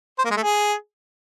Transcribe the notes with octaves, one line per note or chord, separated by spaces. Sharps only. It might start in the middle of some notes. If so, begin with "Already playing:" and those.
C5
A#3
G#3
A3
G#4